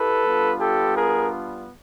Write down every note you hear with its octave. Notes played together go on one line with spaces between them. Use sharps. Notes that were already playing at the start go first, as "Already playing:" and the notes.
Already playing: E4 G4 A4 B4
G3 B3 D4 F4
G4 A4
G#4 A#4